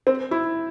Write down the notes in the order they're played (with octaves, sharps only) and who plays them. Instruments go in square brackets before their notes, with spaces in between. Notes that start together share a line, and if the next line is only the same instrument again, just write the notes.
[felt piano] C4
E4